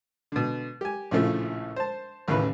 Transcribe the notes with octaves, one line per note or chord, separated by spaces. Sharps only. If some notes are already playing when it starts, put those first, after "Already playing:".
B2 D3
G4 G#5
A#1 A2 C#3 F3 A3
C5 A5
A1 D#2 C#3 E3 E4 B4